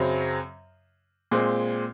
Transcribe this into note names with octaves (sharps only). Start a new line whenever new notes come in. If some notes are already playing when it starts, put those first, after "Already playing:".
Already playing: F#2 C#3 F#3 C4
A#2 G#3 C4